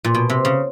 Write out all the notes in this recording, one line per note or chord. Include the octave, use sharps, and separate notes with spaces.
A#2
B2
C3
C#3